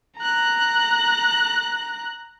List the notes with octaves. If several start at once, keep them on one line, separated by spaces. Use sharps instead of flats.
A#5 F#6